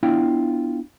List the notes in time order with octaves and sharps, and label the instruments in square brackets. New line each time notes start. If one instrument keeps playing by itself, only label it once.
[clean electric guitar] B3 D4 E4 F4 F5 G5